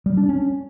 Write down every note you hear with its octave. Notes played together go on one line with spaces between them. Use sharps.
G3
D4
C#4